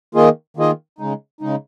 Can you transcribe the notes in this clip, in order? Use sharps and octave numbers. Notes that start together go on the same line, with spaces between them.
D#3 A#3 F4 G#4 D#5
D#3 A#3 F4 G#4 D#5
C#3 G#3 D#4
C#3 G#3 D#4